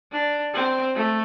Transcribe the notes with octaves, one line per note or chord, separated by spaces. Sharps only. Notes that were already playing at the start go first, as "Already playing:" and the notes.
D4
C4
A3